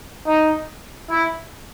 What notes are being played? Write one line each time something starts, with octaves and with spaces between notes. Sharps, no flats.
D#4
E4